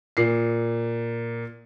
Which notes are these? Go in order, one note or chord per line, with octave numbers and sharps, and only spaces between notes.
A#2 C7